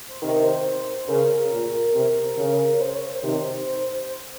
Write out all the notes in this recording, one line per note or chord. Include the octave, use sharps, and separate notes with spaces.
C5
C3 D#3 A#4
C5
C#3 A#4
A#2
C3
C#3
C5
C#5
C5
C3 D#3